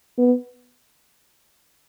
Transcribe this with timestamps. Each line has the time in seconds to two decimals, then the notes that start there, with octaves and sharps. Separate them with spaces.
0.18 B3